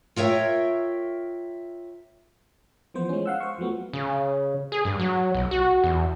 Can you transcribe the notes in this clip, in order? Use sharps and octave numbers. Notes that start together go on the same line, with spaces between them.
F4 A#4 C#5 E5 G5
E3 F3 B3 C5
G#3 C#4
F5 F#5 E6
C5 C#6
F3 F#3 A3 B3
C#3
G#4
G2
F#3
B1
F#4
E2